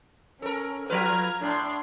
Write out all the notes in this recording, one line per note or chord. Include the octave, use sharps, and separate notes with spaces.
C#4 A4 A#4
F3 F4 B4 A#5 F6 G#6
A2 D4 C6